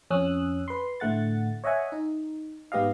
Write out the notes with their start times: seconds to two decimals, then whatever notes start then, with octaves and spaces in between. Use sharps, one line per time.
0.10 F2 C#4 D#6 E6 F#6
0.68 B4 C6
1.00 A2 D3 A3 F#5 A6
1.64 C#5 D#5 E5 F#5 G#5
1.92 D#4
2.72 G#2 B3 G4 D#5 F5